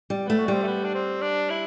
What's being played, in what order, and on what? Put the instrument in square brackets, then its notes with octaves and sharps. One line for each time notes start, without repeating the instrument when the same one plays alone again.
[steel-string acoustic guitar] G3
[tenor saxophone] B3
[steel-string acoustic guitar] A3
[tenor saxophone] F#4
[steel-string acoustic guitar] G3 [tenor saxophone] C4
[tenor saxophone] A3
B3
D4
C4
D4
E4